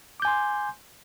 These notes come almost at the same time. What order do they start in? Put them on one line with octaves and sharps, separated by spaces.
D6 G6 G#5 C6